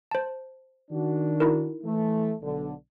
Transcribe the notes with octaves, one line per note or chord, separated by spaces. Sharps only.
C5 A5
D#3 D4 F#4
D#4 E4 A#4
E3 A3
B1 D3